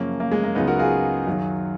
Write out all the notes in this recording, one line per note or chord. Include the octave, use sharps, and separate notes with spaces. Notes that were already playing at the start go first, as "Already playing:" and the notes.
Already playing: F#2 C#3 F3 A#3 C#4
A#3
G#3
A#3
C#2 C#3 F#3 B3 D#4
F#4 A#4
F4 G#4
F#2 D#3 F#3